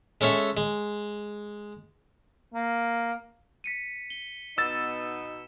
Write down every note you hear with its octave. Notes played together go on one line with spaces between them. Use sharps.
G#3 C#4 A4 C#5 E5
G#3
A#3
B6 C#7 D#7
G7
B2 B3 D#4 E6 A6 E7